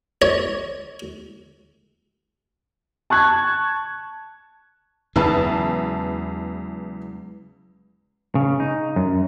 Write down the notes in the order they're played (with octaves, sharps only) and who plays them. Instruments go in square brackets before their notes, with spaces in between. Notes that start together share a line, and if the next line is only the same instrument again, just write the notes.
[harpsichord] C#5
[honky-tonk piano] A5 C#6 F#6 G#6
[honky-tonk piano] E2 B4 A5 [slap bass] C#3 F#3 G#3
[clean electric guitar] C#3
D#4
F#2